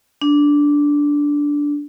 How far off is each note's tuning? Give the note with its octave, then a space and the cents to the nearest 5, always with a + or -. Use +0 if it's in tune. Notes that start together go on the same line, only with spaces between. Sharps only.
D4 -10